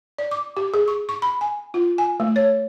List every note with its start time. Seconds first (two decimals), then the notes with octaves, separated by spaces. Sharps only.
0.18 D5
0.31 D6
0.57 G4
0.74 G#4
0.88 C#6
1.09 C#6
1.22 B5
1.41 G#5
1.74 F4
1.98 G#5
2.20 A3
2.36 C#5